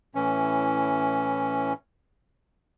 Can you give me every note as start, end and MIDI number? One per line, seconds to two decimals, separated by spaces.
0.15 1.73 45
0.15 1.73 52
0.15 1.73 61